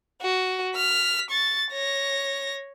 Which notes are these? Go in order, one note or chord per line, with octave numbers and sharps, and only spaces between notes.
F#4
F6 B6
C#6 A6
C#5 A#6